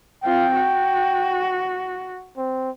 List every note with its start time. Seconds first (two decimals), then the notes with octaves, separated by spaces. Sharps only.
0.24 C4 F4 G5
0.56 F#4
2.37 C4